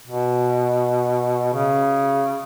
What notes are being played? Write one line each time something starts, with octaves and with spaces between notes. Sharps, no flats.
B2
C#3